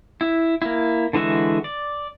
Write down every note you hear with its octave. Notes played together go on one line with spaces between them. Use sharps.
E4
A#3 E4
D3 E3 G#3 F#4 E5
D5